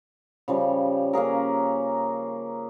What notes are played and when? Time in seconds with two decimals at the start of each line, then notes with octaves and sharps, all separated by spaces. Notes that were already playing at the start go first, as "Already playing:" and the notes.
0.48 C#3 F3 G3
1.13 A#3 C#4 G#4 A#4